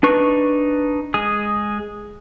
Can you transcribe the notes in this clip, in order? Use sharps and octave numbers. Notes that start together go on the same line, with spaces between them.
D4 D#4 B4 C#6
G#3 G#4 G#5 D#6